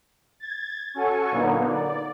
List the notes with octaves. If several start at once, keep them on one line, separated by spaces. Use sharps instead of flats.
G#6 A6
C#4 F#4 A4 G#5 C#6
A#2 D3 F#3 A#3 B3 D#4
D5